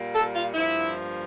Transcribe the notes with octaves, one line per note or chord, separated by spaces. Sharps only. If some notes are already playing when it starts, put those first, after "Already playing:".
Already playing: A#2 G3 A#3
A4
F4
G2 F3 A#3 E4